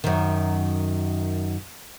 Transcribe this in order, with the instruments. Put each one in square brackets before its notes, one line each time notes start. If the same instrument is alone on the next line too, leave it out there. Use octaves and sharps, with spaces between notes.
[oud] F#2 D#3